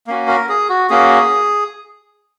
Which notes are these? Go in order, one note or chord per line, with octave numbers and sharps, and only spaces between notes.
A#3 C#4 F#4
A#4
G#4
F#4
A#3 C#4 F#4 G#4